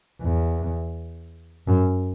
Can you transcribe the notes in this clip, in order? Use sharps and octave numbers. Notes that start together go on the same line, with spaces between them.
E2
F#2